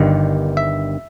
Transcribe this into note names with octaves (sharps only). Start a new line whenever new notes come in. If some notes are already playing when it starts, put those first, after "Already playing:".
Already playing: G1 G2 D#3
E5